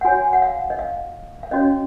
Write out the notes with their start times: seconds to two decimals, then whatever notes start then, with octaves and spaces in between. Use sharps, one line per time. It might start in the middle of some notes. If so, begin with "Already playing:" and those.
0.01 F#5
0.05 F#4 C#5 G#5
0.33 F#5
0.42 F5
0.70 D#5
0.79 F5
1.43 F5
1.51 C#4 F#4 C#5 D#5